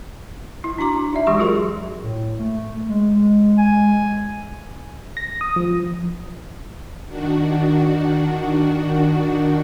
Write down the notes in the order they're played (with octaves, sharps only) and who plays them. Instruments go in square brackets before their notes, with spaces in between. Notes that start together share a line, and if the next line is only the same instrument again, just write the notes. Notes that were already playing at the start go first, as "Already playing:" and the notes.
[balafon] E4
D4 F#4 A#5 D6
F#4
D#4 D5 E5
E3 G#3 G4 C6 C#6
F#3 F4 F#4 G#4 A#4 C6
[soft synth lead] A2
A3
G#3
[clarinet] G#5
[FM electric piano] A#6
D#6
F3
[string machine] D#3 D4 F#4